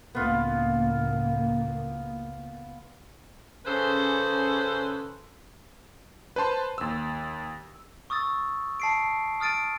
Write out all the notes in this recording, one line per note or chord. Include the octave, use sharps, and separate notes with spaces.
C#2 A2 A#3 B3 F4
C#3 C#4 G#4 A4 B4 C5
B4 C5 A5 C6
D#2 E6
C#6 D#6 E6 A6
A5 C7 D7
D#6 F6 A6 D7 D#7